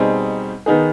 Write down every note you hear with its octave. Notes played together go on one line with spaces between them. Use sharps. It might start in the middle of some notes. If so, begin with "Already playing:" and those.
Already playing: B2 G3 C4 D#4 G#4
D#3 B3 D#4 G#4